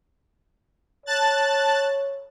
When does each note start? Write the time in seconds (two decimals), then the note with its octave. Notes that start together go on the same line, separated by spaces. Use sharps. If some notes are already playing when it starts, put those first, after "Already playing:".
1.06 C#5 A5 F#6 A6